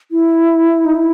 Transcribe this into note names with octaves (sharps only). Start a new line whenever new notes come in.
E4
D#4
E4